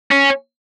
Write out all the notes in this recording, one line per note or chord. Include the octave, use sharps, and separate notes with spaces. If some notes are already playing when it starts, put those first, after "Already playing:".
C#4